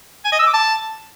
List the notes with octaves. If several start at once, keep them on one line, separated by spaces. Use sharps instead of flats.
G#5
D#5
E6
D6
A5